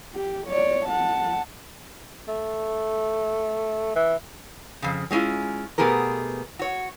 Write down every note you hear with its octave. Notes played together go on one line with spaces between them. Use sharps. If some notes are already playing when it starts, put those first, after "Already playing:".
G4
C#5 D5
F#5 A5
A3
E3
F2 C#3
F#3 G#3 C#4 E4 F4
B2 A3 B3 G4 G#4 A#4
F#4 C#5